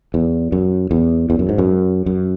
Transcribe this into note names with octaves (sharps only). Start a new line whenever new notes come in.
E2
F#2
E2
E2
F#2
G#2
F#2
F#2